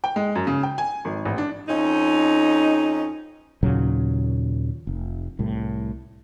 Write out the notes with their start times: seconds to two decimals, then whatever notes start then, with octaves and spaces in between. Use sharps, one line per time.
0.04 G5
0.16 G#3
0.35 F#2
0.47 C#3
0.63 G5
0.78 G#5
1.05 G#1
1.26 A1
1.38 D4
1.69 F2 C#4 D#4
3.63 D#2 A#2 C#3 F#3
4.87 F1
5.39 C2 A2